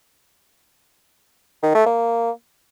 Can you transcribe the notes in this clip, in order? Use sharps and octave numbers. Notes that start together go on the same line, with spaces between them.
D#3
A3
A#3